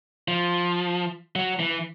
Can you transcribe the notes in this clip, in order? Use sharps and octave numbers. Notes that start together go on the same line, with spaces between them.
F3
F#3
E3